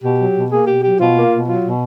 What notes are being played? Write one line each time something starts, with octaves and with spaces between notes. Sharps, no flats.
B2 G4
F#3
B2
A#3 G#4
B2 G4
F#3 G4
B2 F4
A#3
B2
F#3 F4
B2